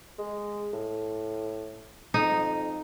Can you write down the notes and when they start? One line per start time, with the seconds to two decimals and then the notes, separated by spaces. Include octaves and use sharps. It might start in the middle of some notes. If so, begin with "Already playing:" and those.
0.18 G#3
0.73 A2
2.14 F2 D#4